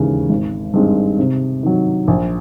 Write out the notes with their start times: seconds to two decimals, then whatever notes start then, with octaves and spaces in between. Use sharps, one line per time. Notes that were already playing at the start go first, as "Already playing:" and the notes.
Already playing: E1 D#2 C#3 E3
0.30 G#1
0.74 G2 D#3 G#3 C4
1.19 C3
1.63 D#3 F#3
2.08 A#1